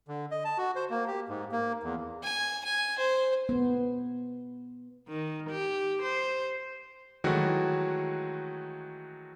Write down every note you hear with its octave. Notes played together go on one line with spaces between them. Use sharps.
D3
D#5
A5
F#4
C5
A#3
G4
G#2
A#3
E2
G#5
G#5
C5
B3
D#3
G4
C5
D#3 E3 F#3 G#3 A3 F#4